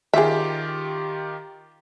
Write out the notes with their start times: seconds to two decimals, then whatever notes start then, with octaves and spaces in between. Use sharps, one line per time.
0.13 D#3 F4 G4 G#4 E5